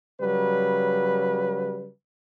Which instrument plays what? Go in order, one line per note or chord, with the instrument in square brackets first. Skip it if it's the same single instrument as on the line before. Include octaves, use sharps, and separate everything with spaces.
[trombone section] C#3 F#3 G3 B4